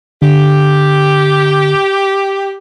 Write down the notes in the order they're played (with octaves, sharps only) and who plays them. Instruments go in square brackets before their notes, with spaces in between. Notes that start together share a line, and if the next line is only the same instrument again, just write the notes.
[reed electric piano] D3 [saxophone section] G4